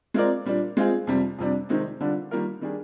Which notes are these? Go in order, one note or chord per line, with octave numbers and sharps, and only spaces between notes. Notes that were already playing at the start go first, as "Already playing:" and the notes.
G#3 C4 F4 A#4 D5
A#2 G3 D4
G#3 C4 F4 G#4
F2 C3 G3
F2 C3 G3 D4
C3 D#3 G#3 C4 D#4
D3 G3 D4 F4
D#3 G3 A#3 F4 A#4
D#3 G3 D4 G#4